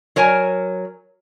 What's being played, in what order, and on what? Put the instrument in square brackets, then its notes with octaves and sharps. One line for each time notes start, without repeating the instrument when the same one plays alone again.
[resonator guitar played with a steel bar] F#3 A#4 C#5 G#5